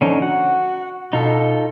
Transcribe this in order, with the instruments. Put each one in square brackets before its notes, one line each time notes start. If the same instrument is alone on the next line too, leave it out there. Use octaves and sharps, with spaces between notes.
[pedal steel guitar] D3 C#4 D#4 [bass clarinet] F3
[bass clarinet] F#4 [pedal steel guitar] F#5
[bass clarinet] B2 [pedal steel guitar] D#4 F4 A4